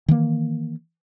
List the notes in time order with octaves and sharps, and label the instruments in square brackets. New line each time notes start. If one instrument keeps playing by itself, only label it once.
[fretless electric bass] D#3 E3 A#3